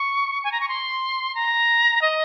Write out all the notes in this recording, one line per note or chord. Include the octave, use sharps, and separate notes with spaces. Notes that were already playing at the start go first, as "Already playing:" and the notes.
Already playing: C#6
G#5
A#5
C#6
C6
A#5
D#5